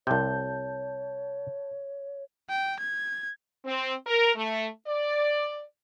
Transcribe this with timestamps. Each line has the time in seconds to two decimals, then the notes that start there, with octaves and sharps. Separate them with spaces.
0.07 C2 C3 C#5 A5 G6
2.49 G5
2.79 G#6
3.66 C4
4.06 A#4
4.36 A3
4.87 D5